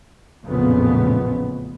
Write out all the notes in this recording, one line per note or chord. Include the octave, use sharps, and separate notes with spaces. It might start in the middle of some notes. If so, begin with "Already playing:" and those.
A1 F2 A#2 C#3 B3